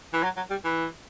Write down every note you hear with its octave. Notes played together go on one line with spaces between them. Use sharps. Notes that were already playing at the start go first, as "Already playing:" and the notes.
E3
F#3
F#3
G3
E3